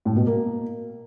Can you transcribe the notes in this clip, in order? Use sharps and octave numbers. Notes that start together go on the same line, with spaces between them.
A2
B2
A#3